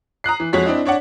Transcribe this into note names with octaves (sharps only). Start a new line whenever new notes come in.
A#5 D#6 F#6 C7
E3
F2 G#3 F#4 C#5 B6
C4 D4 E4 D#5
D4 C#5 D5 F#5